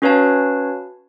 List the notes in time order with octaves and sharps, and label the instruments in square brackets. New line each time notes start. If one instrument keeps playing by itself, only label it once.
[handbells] C#4 F#4 B4 C#5 F5 A5